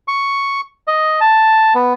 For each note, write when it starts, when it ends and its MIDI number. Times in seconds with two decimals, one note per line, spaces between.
0.08 0.61 85
0.88 1.20 75
1.21 1.74 81
1.75 1.93 59